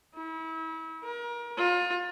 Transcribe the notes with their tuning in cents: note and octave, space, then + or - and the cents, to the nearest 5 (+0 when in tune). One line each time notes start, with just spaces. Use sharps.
E4 -35
A#4 +35
F4 +30